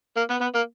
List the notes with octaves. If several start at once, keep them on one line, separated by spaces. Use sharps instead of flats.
A#3
B3
B3
A#3